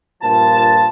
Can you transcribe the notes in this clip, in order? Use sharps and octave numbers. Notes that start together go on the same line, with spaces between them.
G2 A#2 F3 F4 A5